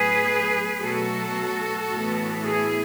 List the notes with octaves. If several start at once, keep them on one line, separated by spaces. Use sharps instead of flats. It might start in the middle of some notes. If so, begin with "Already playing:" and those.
Already playing: A2 F#3 B3 G#4 B4
B2 F#3 A3 F#4 A4
A2 E3 B3
E4 G#4